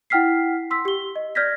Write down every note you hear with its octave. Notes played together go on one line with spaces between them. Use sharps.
E4 F#5 G5 F6 B6 C7
C6 E6 B6
G4 G7
D#5
D5 F6 G6 G#6 A#6 B6